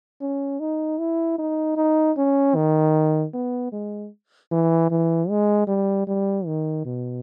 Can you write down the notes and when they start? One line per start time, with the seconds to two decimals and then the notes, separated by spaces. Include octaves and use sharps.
0.22 C#4
0.60 D#4
0.99 E4
1.39 D#4
1.77 D#4
2.17 C#4
2.55 D#3
3.34 B3
3.73 G#3
4.52 E3
4.91 E3
5.30 G#3
5.68 G3
6.08 G3
6.47 D#3
6.86 B2